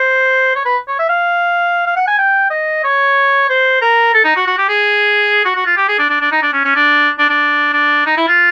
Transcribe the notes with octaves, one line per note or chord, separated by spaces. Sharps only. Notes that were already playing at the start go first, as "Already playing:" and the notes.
Already playing: C5
C#5
B4
C#5
E5
F5
F5
F#5
G#5
G5
D#5
C#5
C5
A#4
A4
D#4
F#4
F#4
G4
G#4
F#4
F#4
F4
G4
G#4
D4
D4
D4
D#4
D4
C#4
C#4
D4
D4
D4
D4
D#4
E4
F4